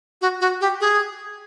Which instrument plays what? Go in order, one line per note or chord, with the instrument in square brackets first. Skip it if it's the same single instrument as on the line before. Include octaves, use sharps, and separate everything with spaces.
[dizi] F#4
F#4
G4
G#4